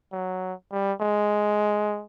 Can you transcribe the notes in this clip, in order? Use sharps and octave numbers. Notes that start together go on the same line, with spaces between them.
F#3
G3
G#3